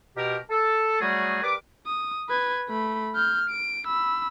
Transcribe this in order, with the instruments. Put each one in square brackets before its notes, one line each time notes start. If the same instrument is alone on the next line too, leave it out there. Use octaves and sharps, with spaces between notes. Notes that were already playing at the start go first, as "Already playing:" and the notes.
[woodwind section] B2 G4 A#4
A4
F#3 G3 A3 F#4 G#4
G3 A#4 B4 D6
[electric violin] D#6
B4 G#6
A3 B5
F6 G6
D7
B5 E6